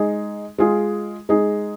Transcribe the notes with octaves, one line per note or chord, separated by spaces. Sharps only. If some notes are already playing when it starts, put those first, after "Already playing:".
Already playing: G#3 D#4 G#4
G#3 F4 G#4
G#3 D#4 G#4